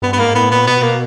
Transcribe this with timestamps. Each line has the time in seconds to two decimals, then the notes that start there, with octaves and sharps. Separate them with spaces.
0.02 G2 B3
0.13 B3
0.18 G#2 A#3
0.34 A2 B3
0.51 A#2 B3
0.67 B2 B3
0.83 A#3